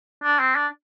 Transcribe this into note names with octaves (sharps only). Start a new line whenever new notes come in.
D4
C4
D4